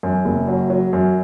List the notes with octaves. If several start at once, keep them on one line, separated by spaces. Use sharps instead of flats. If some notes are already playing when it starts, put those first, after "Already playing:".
F#2
F#1
F#3
F#3
F#2